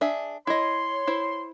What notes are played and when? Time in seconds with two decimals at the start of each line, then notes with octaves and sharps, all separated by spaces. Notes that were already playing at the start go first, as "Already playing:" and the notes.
0.01 D4 G#4 E5
0.47 E4 C#5 D#5 C6
1.07 E4 C5